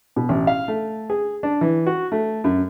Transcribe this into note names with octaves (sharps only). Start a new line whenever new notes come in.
B2
A1
F5
A3
G#4
D4
E3
F#4
A3
F#2